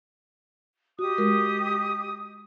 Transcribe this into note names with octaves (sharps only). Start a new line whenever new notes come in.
F#4 G4 D#5 D#6
G#3 F#4 A#4